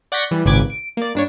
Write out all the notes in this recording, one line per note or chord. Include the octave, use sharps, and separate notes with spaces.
D5 F#5 C#6 G6 A#6 B6
E3 G3
G#1 C#2 A#2 B4 D6 G#6
D7
A#3 D5
G2 D4 C#5